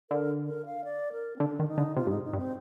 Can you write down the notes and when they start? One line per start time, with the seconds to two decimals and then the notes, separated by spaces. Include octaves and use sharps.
0.10 D3 A#4
0.47 A#4
0.66 F5
0.84 D5
1.12 A#4
1.36 C4
1.40 D3 D4
1.59 D#3
1.68 D#4
1.78 D3
1.96 C3 F4
2.07 G2
2.10 G#2 D#4
2.24 D#4
2.33 G2
2.38 C4